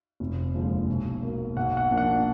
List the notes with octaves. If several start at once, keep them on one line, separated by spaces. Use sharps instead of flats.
F1
D#2 D3 F3 G#3
B1
B2 A#3
B1 F#5
F#5
A#2 F3 A#3 D4
F#5